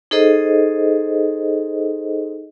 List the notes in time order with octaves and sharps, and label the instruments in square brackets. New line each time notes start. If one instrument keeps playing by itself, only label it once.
[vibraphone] D#4 G#4 A4 C5 D#5